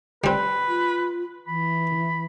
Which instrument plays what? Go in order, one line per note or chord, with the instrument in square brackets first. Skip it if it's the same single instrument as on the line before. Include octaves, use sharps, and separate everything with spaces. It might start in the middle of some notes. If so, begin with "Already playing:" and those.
[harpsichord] G3 C4 [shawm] B4
[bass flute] F4
[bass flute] E3 [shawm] B5